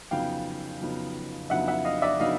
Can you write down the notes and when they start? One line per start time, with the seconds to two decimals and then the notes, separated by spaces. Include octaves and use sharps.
0.11 F2 C#3 F#3 B3 D#4 F5 G5
0.81 F2 C#3 F#3 B3 D#4
1.50 F2 C#3 F#3 B3 D#4 E5 F#5
1.68 E5 F#5
1.85 D#5 F5
2.02 D5 E5
2.20 C#3 F#3 B3 D#4 D#5 F5